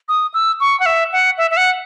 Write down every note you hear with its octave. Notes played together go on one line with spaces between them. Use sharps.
D#6
E6
C#6
F#5
E5
F#5
E5
E5
F#5